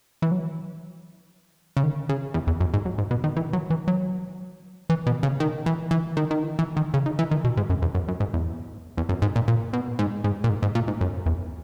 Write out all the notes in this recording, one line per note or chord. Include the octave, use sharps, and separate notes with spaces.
E3
F#3
C#3
D#3
C#3
E2
E2
F#2
G#2
F#2
G#2
B2
D#3
E3
F#3
E3
F#3
E3
B2
C#3
D#3
E3
E3
D#3
D#3
E3
E3
D#3
C#3
D#3
E3
D#3
B2
G#2
F#2
E2
F#2
F#2
G#2
E2
E2
F#2
G#2
A#2
A#2
B2
G#2
G#2
A#2
G#2
G#2
A#2
G#2
F#2
E2